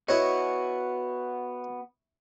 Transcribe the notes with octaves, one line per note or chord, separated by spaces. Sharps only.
B3 E4 F#4 C#5 D#5